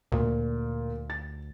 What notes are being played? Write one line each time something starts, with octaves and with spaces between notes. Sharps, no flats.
D2 A#2
A6